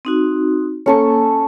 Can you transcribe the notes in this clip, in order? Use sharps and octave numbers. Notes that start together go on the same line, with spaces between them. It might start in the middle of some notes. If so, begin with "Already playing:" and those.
C4 D#4 F#4
A#3 C#4 A4 C#6